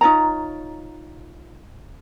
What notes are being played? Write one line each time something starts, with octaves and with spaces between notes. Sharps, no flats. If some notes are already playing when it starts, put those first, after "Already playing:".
D#4 F4 C#5 A#5